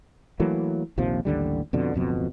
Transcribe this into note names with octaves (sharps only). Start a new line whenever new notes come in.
E3 F#3 A3 A#3
A#1 D#2 C3 F3
A1 D#2 D3 G3
F2 B2 D3
D1 F2 B2